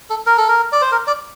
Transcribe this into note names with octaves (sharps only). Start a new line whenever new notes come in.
A4
A#4
A4
A#4
D5
C5
A#4
D5